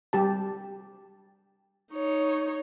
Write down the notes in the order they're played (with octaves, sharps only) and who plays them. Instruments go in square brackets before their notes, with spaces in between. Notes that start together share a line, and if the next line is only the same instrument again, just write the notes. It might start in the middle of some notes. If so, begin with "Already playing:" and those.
[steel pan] G3 G4 A5
[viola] D#4 C#5